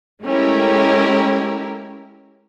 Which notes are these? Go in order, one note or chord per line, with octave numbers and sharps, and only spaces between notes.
G#3 A3 C#4 E4 G4 A#4